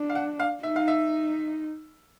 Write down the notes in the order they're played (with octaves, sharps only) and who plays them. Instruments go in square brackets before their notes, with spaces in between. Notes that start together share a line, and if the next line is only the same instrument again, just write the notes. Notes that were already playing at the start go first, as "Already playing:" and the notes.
Already playing: [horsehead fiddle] D4
[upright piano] F5
F#5
F5
[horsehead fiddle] D#4 [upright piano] E5
[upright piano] F5
E5